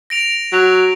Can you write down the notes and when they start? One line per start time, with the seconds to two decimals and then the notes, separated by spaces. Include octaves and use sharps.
0.10 A#6 D7 F7
0.52 F#3